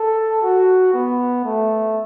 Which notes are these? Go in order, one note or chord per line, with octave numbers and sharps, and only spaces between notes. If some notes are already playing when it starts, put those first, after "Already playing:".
Already playing: A4
F#4
B3
A3